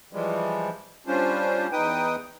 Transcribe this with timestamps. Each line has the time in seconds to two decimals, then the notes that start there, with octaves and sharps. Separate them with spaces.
0.13 E3 F3 G3 G#3
1.07 G3 C#4 D4 F4 C5
1.72 E2 D#4 B4 G5 D#6